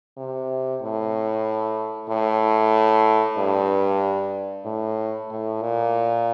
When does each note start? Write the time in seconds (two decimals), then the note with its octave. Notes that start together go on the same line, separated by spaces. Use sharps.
0.17 C3
0.81 A2
2.09 A2
3.38 G2
4.65 A2
5.30 A2
5.62 A#2